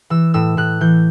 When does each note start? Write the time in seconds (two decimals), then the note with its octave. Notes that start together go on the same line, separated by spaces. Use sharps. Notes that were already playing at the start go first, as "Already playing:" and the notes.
0.10 E3 E6
0.34 A2 E6
0.57 A2 F#6
0.81 E3 G6